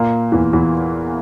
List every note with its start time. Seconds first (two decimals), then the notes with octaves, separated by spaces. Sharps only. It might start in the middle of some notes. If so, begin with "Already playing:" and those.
Already playing: A#2 A#3
0.32 E2 E3
0.53 E2 E3